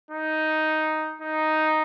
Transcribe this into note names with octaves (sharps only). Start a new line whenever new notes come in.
D#4
D#4